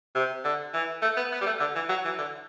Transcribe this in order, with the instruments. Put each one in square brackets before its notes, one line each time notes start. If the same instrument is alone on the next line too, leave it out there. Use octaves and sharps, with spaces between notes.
[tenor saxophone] C3
D3
E3
A3
B3
B3
G3
A3
D3
E3
F#3
E3
D3